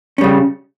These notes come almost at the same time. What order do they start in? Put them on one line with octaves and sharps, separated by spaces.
C#4 G3 C#3